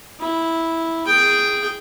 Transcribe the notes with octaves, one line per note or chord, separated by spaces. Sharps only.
E4
G#4 G5